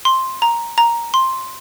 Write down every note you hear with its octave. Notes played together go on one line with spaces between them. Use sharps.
C6
A#5
A#5
C6